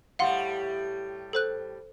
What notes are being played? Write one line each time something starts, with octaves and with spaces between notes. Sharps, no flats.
A2 G3 F5 F#5 C6
A4 C5 F#6